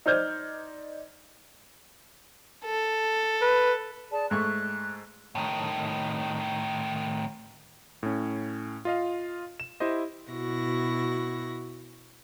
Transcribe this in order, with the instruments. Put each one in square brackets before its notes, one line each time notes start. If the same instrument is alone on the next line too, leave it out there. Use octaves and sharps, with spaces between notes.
[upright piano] D#4 C5 D5 F6 G6 G#6
[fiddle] A4
[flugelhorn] B4
[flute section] G#4 D5 A5
[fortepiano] G#2 A3 C#6 [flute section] F#6
[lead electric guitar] A2 D#3
[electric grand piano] A2 C#4
F4 D#5 F5
E7
E4 G4 C5 D#5
[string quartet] B2 E4 F#4 C#6 A#6